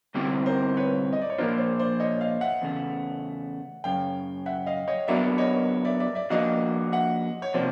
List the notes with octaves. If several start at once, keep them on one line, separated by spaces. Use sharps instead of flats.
D3 G3 C4 E4 G4
A#4 C5
B4 C#5
D#5
D5
C#5
A#2 F3 A#3 D4 F4 A#4 C5
C5 D5
C5 D5
C#5 D#5
D#5 F5
E5 F#5
E2 C#3 A3
F#2 C#3 F5 G5
E5 F#5
D#5 F5
C#5 D#5
F#3 B3 D4 F#4 A#4 D5 E5
C#5 D#5
D5 E5
D5 E5
D5 E5
F3 A#3 D4 F#4 D#5 F5
E5 F#5
C#5
C3 F3 A#3 C5 D5